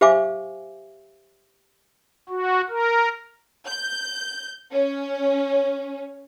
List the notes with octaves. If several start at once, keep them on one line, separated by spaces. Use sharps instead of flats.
G4 C5 E5 F5 G#5 D6
F#4
A#4
G6
C#4